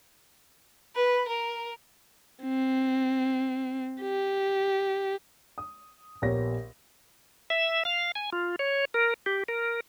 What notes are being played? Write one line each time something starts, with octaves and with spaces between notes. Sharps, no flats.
B4
A#4
C4
G4
D#6
A#1 B3 G4 A#4 C#5 A#6
E5
F5
G#5
F4
C#5
A#4
G4
A#4